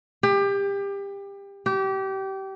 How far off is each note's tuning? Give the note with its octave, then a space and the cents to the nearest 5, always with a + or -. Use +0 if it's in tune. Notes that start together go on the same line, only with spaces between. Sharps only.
G4 +25
G4 -25